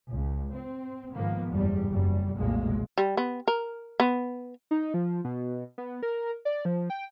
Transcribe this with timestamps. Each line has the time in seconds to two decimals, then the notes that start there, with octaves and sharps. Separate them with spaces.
0.11 C#2
0.55 C4
1.14 G#2 D#3 F3 A#3 B3
1.51 F#1 E2 G#2 G3
1.89 F#1 F#2 G3
2.35 F1 B1 A#2 G#3 A#3
2.98 G3
3.17 B3
3.48 A#4
4.00 B3
4.71 D#4
4.94 F3
5.24 B2
5.78 B3
6.03 A#4
6.45 D5
6.65 F3
6.90 G5